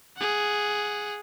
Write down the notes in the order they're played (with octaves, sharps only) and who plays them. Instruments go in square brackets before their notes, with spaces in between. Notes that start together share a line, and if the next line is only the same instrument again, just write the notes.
[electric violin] G#4 F#5